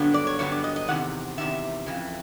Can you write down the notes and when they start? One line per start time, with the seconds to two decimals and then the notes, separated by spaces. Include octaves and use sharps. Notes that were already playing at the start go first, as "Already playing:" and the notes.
Already playing: G2 D3 F#3 B3
0.14 D5
0.27 C#5
0.39 G2 D3 F#3 B3 C#5
0.52 D5
0.64 D#5
0.76 D#5
0.88 E2 C3 D#3 F#5
1.38 E2 C3 D#3 E5
1.86 F2 C#3 E3